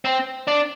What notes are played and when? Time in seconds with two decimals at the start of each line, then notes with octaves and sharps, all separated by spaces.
0.05 C4
0.47 D4